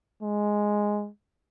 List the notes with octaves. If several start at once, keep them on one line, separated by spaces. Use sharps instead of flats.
G#3